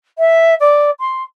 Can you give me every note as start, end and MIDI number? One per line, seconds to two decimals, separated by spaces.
0.18 0.55 76
0.60 0.91 74
1.00 1.23 84